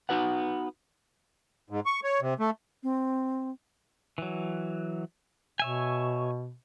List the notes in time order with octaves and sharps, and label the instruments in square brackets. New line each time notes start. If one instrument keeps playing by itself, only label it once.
[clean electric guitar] B3 D#4 F#4 B4 F#5
[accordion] G#2
C#6
C#5
C3
A3
[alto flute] C4
[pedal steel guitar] E3 F#3
[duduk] B2 [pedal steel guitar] C#5 E5 G#5